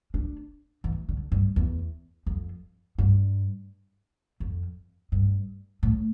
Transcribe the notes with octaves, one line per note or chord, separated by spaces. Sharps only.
D4
E3
D3
G2
E2
F2
G2
F2
G2
A2